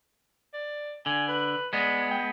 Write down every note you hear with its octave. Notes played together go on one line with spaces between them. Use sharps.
D5
D3 G#5
B4
G#3 B3 D5
G5